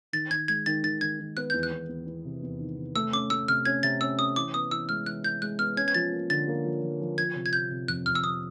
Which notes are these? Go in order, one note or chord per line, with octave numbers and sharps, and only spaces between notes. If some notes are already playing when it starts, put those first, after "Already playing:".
D#3 A6
D#3 G#6
G#3 G#6
D#3 A6
D#3 A6
D#3 G#6
D#3
B3 F#6
E2 G6
F#6
E2
E2
E2
C3
E2
D#3
C3
A3 E6
C#4 D6
A3 E6
C3 F6
C#4 G#6
C3 A6
C#4 E6
C#4 D#6
E3 D6
B3 D#6
E3 E6
G#3 F6
E3 F#6
E3 G6
G#3 F#6
B3 F6
C#4 G#6
G#6
F3 A6
A#3
D3 A6
A#3
F3
F3
F3
F3 G#6
C3
G#6
C3 G6
C3
F2 F#6
F2 F6
E6
C3 D#6